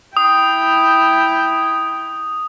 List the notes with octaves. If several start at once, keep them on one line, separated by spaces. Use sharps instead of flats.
E4 G5 D#6